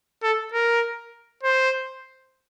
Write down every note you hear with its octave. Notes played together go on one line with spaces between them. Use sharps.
A4
A#4
C5